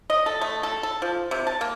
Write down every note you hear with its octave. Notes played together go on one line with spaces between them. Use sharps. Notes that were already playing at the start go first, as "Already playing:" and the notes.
D#5
A4
A3
A4
A4
F3
C3
A5
A#3